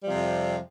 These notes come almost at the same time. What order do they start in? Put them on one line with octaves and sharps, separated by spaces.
G3 F3 C3 F2